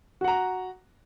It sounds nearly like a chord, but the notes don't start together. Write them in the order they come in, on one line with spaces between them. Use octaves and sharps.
F#4 F#5 A#5